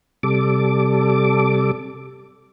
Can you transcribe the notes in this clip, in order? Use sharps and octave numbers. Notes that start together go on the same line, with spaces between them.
C3 G3 A4 D6